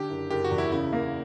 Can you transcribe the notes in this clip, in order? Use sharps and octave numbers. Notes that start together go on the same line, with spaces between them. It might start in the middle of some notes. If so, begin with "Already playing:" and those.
Already playing: D3 G4
F#1
F#1 G4
F#4
E2
E4
C#3 E4
A#3